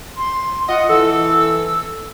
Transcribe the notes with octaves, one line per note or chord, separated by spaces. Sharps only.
C6
F4 D#5 F#5
E3 A4 E6